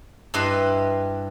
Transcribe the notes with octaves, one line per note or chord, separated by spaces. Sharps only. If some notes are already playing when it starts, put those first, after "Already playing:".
G2 E4 G4 B4 D#5 C6